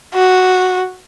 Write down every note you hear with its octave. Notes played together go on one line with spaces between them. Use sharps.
F#4